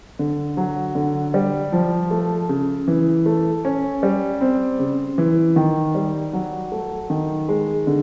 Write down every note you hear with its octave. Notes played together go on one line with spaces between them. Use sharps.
D3
F#3
D3
G3
F3
A3
C#3
E3
A3
C#4
G3
C4
C#3
E3
D#3
G3
F#3
A3
D#3
G#3
D3